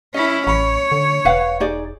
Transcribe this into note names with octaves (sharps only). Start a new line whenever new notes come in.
C#4 E4 D#5
A1 C#5 B5
D3
E1 B4 F5 F#5
D#4 G#4 D5